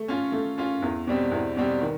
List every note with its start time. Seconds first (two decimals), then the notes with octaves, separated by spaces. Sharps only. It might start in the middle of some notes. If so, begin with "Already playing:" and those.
Already playing: A3
0.08 C#4 F4
0.32 A3
0.58 C#4 F4
0.82 E2
1.07 B2 G3 C4
1.32 E2
1.57 B2 G3 C4
1.81 D#3